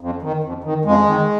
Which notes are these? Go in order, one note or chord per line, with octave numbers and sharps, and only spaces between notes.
F2
D#3
F2
D#3
F2 G#3
D#3